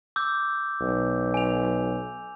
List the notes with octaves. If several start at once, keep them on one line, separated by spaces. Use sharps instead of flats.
D6 E6 G6
B1
G#5 F7